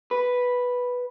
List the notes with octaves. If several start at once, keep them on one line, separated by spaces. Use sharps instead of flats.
B4